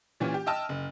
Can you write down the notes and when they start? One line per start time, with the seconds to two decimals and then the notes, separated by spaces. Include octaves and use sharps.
0.20 A#2 E3 C#4 F4 G4
0.34 G4
0.47 D#5 E5 G5 A5 E6 F6
0.69 F#1